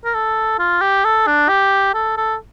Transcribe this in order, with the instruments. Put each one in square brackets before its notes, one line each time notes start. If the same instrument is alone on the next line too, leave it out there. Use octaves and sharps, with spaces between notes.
[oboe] A#4
A4
F4
G4
A4
D4
G4
A4
A4